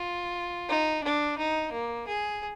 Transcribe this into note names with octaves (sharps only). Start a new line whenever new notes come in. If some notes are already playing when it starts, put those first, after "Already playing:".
Already playing: F4
D#4
D4
D#4
A#3
G#4